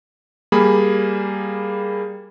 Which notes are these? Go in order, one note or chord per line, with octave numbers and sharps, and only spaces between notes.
G3 A#3 G#4 B5